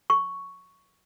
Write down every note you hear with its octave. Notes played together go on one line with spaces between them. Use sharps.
C#6